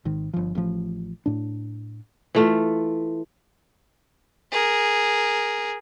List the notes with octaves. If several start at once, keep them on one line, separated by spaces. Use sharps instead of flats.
G#1 D#3
G1 F3
A1 A2 F3
A2 D4
E3 A3 F4
G#4 A#4